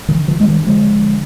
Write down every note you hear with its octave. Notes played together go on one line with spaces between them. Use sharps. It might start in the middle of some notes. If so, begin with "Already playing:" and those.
D#3
D3
D3 F3
G2 G#3
D#3 G3
D3 F3 G#3
D3